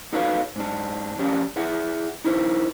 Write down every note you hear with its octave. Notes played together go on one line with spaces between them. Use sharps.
D#4 F#4 A4 B4 C#5 F5
G#2 D4
F2 C#4 D4 G4 D5
E4 G#4 E5 F#5
D#4 E4 A#4 C5